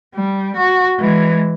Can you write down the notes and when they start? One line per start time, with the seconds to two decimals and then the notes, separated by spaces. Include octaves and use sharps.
0.14 G3
0.57 F#4
0.99 E3 G#3